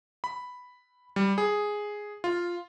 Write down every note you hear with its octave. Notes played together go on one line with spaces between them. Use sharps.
B5
G3
G#4
F4